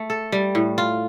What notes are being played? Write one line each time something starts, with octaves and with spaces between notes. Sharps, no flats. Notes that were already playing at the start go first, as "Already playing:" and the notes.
Already playing: A3
A4
G3
A2
F4